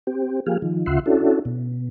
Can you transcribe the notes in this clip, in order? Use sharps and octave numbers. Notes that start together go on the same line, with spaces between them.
C4 G4
F3 A#3 G4 G#4 F5
D#3 F3
D2 C#3 F4 E5 F#5 C6
C#4 D4 E4 F#4 A4
B2